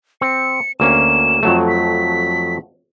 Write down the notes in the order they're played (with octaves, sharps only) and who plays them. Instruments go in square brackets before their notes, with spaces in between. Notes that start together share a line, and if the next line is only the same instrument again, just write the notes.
[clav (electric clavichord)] C4 [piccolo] C#7
[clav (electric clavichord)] D2 A#3 C#4 [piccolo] E7
[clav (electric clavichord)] F2 F#3 A3
[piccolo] B6